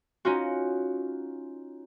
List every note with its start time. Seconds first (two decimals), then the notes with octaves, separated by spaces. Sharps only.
0.25 C#4 D#4 F4 F#4